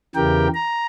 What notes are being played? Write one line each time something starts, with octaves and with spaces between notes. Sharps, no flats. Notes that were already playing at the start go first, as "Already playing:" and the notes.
E2 C#3 E3 G4 A#4 G5
A#5